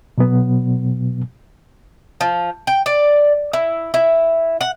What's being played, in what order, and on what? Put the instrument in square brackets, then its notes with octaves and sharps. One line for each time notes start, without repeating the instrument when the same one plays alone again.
[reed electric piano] B2 F#3 B3
[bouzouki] F3
G5
D5
E4
E4
F#5